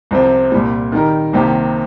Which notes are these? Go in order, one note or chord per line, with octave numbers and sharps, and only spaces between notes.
C2 C3 F3 C4
C2 A#2 G3
D#3 G3 D#4 A#4
C2 C3 D#3 A#3 G4